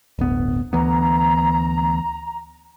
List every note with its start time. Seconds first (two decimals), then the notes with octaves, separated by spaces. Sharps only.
0.19 D1 G1 B3
0.73 D2 E3 B3 A#5